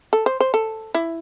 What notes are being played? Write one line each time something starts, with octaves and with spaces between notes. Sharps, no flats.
A4
C5
C5
A4
E4